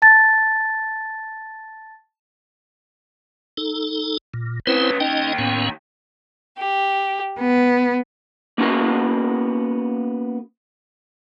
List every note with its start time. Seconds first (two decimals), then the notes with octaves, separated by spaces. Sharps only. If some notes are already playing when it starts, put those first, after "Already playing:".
0.02 A5 A6
3.57 D#4 A4
4.34 A#2
4.67 C4 C#4 E4 B4 C5
5.00 D#2 C#4 D#4 D#5 G5
5.38 A2 B3 C#4
6.57 G4
7.39 B3
8.58 A#3 B3 C#4 F#4 A#4